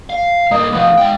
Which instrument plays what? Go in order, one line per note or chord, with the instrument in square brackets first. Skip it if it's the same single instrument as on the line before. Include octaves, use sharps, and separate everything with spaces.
[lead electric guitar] F5
[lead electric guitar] G2 A#3 [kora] D#4
[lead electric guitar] F3 A3 [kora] B3 [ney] F5
[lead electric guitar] G#3 G5